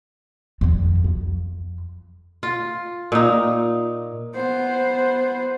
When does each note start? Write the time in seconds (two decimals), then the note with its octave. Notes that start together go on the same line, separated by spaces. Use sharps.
0.61 F2 D#3
1.04 F2
2.43 F4
3.12 A#2 D#4
4.34 B3 C5